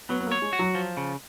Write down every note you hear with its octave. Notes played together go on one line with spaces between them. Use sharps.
F#3 B3
B3
A#3
C#5
G#3
F#4
F#3
F3
C#3